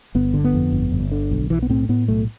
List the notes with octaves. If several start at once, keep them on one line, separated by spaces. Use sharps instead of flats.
G1 B3
D3
B3
F2
G1
G1
D3
B1
B1 E3
B3
A2 C4
A2 B3
B1 A3